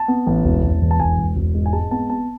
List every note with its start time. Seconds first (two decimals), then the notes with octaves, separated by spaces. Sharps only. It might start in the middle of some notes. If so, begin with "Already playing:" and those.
Already playing: A5
0.08 B3
0.27 A1
0.45 E1
0.63 E1
0.82 E2
0.91 A5
1.00 E1 G#5
1.18 E1
1.36 E1
1.55 G#2
1.66 G#5
1.73 G#3 A5
1.91 B3 A5
2.09 B3 A5